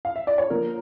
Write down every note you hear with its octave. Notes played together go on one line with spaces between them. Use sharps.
F5
E5
D5
C#5
D3 F3 A#3 A#4